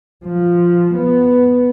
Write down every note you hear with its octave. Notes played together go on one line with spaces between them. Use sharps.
F3
B3